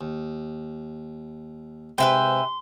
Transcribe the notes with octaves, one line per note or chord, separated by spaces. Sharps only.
D#2
G#2 C3 B4 E5 G5 C6